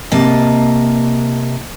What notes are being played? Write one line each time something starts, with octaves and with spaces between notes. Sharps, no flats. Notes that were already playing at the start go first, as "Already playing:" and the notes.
C3 A#3 D#5 A5